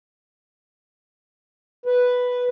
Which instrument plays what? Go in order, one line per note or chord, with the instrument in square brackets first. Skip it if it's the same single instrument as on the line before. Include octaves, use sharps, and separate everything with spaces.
[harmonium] B4